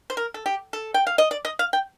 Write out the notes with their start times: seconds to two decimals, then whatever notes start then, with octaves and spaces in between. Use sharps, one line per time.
0.10 C5
0.17 A#4
0.34 A4
0.46 G4
0.73 A4
0.94 G5
1.07 F5
1.18 D#5
1.31 D5
1.45 D#5
1.59 F5
1.73 G5